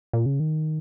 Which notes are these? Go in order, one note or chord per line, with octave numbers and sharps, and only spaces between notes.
A#2
C#3
D#3